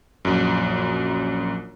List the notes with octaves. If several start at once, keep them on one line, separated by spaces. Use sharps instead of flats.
A#1 F#2